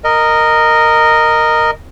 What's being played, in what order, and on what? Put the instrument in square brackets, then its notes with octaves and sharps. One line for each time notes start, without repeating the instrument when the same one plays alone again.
[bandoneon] A#4 D#5